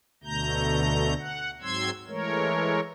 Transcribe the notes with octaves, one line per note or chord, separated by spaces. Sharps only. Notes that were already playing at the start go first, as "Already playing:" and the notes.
D2 B2 D3 A3 A#5 G6
F#5
G#2 F#3 C4 C6 E6 G#6
E3 G#3 A3 A#4 C#5